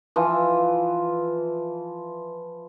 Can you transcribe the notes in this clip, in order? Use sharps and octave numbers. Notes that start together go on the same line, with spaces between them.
E3 F3